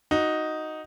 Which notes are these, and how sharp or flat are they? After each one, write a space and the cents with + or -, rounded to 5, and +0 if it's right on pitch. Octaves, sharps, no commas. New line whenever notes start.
D#4 +0 F#4 +0